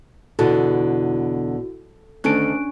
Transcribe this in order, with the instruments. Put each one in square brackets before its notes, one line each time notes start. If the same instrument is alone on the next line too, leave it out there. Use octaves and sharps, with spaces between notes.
[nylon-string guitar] E2 B2 D3 [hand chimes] E4 F#4 [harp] A4
[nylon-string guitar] D2 D#3 A4 [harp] C#4 D4 [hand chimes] F#6 D7